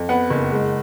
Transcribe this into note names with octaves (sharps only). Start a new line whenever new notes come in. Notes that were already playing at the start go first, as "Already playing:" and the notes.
Already playing: F2
B3 F#5
F#1
G#3